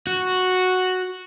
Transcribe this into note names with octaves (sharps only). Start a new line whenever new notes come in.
F#4